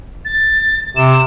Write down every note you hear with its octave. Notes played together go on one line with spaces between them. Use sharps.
A6
C3 E7